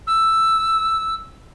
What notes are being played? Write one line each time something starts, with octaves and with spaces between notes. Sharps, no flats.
E6